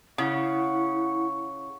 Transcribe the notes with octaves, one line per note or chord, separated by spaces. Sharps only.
C#3 E4 F#5 C#6